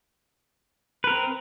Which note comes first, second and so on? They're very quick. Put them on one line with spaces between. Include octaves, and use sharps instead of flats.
B4 A#4 C4